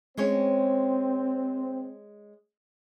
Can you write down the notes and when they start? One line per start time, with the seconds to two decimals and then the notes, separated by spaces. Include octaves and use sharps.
0.17 G#3 C4 C#4 C#5